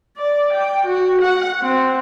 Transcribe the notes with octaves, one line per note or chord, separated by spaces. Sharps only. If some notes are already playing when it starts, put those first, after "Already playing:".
D5
G5
F#4
F#5
C4